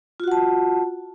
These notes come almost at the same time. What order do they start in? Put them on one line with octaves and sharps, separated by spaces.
F4 F#4 F#5 A5